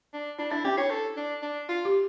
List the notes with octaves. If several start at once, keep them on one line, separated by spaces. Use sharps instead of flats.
D4
D4 E4
D4 E4
C#4 G4
E4 C#5
A4
D4
D4
F4
G4